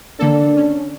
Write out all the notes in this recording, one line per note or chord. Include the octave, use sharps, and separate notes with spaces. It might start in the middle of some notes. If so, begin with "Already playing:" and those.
D3 A#3 D4 A4
C#4